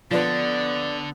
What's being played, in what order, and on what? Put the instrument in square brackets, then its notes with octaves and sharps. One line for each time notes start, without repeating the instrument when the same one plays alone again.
[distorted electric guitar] D3 [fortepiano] F3 D4 B4 [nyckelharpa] B3 [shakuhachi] D5